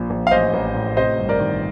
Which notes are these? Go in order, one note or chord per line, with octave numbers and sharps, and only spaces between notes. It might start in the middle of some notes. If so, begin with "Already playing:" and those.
Already playing: A#1 A#2
A#1
F5
A1 C5 D#5
A1
A2
C3 C5 D#5
G1
A#4 D5
D#3